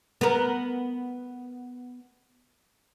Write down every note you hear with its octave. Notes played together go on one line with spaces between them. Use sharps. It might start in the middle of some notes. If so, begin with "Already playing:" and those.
B3 A#4